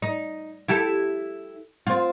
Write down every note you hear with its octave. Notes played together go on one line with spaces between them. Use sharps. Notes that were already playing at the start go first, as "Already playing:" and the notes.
D#4
E4 G4 A4
C4 F4